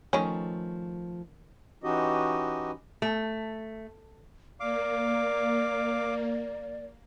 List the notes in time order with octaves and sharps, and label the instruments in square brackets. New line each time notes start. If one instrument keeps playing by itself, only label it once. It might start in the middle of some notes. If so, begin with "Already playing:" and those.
[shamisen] D#3 C#4 [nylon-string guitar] F3 A3
[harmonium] E3 C#4 D#4 F#4 G4 D#5
[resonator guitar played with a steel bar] A3
[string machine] A#3 [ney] D5 [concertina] F5 D6